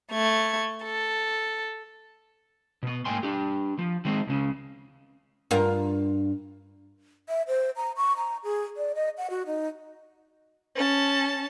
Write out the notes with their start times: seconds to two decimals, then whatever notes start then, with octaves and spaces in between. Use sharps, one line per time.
0.12 A3 G#6
0.84 A4
2.83 B2 B3
3.05 G#2 A#3 G5 G#5 C6
3.23 D4 G4
3.79 F3
4.05 D#3 G#3 C4
4.27 C#2 C#3
5.51 G2 F4 A#4
7.29 E5
7.48 C5
7.76 A#5
7.97 C#6
8.17 A#5
8.44 G#4
8.77 D5
8.95 D#5
9.18 F#5
9.30 F#4
9.46 D#4
10.76 C#4 A5